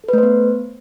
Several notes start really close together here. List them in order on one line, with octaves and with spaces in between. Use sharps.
A4 B4 A3 C5 B3